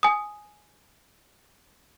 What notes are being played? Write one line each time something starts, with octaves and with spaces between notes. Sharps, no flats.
G#5 D#6